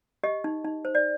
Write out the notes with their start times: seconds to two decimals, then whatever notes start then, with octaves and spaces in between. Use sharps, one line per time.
0.23 G4 D#5
0.44 D#4
0.65 D#4
0.85 C5
0.95 D5